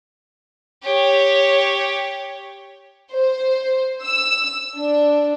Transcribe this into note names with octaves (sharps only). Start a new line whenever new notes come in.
G4 C#5
C5
E6
D4